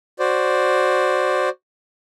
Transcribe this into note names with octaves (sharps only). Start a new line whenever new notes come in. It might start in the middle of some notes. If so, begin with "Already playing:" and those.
F#4 C5 D5